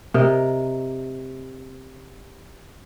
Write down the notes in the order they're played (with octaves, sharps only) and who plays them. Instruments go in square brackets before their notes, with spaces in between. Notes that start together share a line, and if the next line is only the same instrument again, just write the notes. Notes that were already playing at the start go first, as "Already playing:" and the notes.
[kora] C3 A#4 D#5